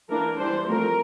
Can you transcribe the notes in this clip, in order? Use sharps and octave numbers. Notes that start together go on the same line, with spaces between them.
E3 A#3 D4 A#4
E3 G3 D4 C5
F3 A3 C4 A#4